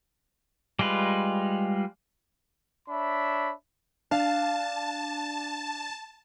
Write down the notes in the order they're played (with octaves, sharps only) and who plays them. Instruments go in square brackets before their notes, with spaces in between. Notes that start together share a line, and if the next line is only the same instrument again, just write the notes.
[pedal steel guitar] G3 G#3 F4 B4
[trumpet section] D4 C#5 E5 B5
[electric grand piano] D4 [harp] F5 [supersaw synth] A5